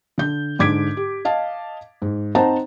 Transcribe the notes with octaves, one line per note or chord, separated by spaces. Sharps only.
D3 G6
G#2 D3 D6 G#6 B6 D7
G4
D#5 F5 A5
G#2
C4 D#4 C5 F#5 A5 A#5